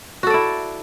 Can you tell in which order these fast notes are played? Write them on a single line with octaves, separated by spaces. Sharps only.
F#4 A4 D5 E4